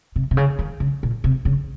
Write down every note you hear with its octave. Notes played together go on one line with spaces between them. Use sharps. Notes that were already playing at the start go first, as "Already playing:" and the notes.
C3
C3
C#3
D#3
C#3
A#2
C3
C#3